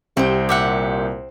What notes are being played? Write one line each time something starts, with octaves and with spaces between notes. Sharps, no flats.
C2 C4 G4 C5
A#2 G4 E5 F#5